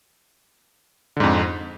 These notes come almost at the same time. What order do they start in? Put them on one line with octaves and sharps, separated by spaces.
D3 G#2 F2